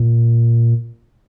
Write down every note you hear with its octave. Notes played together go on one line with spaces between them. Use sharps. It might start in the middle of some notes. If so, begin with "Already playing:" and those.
Already playing: A#2